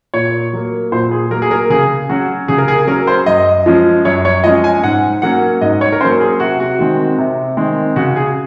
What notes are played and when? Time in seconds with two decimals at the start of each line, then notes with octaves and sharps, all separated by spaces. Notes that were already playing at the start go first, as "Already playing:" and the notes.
0.14 A#2 C#5
0.53 F#3 A#3
0.92 A#2 C5
1.11 G#4
1.31 F#3 A#4
1.34 A#3
1.42 G#4
1.51 A#4
1.70 C#3 G#4
2.09 F#3 C#4 F#4
2.48 C#3 G#4
2.58 A#4
2.68 G#4
2.87 F#3 C#4 A#4
3.07 C5
3.26 F#2 D#5
3.66 F3 G#3 C#4
4.05 F#2 C#5
4.25 C#5
4.44 F3 G#3 C#4 D#5
4.64 G#5
4.83 G#2 F#5
5.22 F#3 A#3 C#4 F#5
5.61 G#2 D#5
5.81 C#5
5.92 A#4
6.01 F#3 A#3 C#4 C5
6.20 G#4
6.40 C3 F#4
6.60 F#4
6.79 D#3 G#3 C4
7.18 C3
7.57 D#3 G#3 C4
7.96 C#3 F#4
8.16 G#4